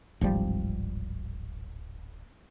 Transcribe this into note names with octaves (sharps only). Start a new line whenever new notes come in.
D1 G#1 F3 G3